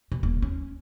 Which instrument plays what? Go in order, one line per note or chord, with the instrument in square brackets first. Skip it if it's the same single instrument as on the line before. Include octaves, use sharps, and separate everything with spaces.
[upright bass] B2
D#1
C#4